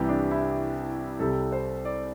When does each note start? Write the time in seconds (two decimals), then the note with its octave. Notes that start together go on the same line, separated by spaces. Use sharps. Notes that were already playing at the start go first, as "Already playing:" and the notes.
Already playing: C2 C3 E3 G3 G4
0.09 D4
0.31 E4
1.19 C2 C3 G3 A4
1.52 C5
1.85 D5